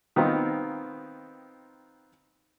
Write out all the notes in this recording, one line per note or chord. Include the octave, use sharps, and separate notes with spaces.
D#3 B3 C4 D#4 F4